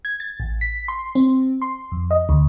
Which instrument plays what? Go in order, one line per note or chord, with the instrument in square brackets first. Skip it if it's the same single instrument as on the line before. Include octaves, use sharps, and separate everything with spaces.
[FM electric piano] G#6
A6
A1
B6
C6
C4
C6
F2
D#5
D2